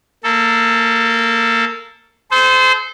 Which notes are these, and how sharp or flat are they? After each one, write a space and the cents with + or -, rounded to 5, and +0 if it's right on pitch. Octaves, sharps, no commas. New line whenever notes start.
A#3 -20 A4 +0
A4 -45 C5 -20